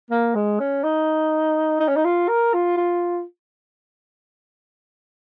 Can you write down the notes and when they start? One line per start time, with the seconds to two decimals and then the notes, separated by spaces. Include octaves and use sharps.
0.11 A#3
0.35 G#3
0.60 C#4
0.84 D#4
1.80 D#4
1.88 C#4
1.96 D#4
2.05 F4
2.29 A#4
2.54 F4
2.77 F4